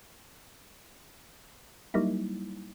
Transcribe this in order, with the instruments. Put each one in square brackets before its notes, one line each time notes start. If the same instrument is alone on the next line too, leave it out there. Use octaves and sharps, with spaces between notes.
[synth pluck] F#3 G3 A#3 D#4 E4